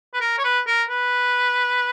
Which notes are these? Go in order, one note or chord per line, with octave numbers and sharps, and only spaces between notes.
B4
A#4
C#5
B4
A#4
B4